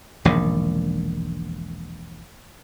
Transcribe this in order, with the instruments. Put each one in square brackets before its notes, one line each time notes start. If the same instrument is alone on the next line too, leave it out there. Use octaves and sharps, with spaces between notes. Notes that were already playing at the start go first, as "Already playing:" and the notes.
[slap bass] E1 A#1 G#2 D#3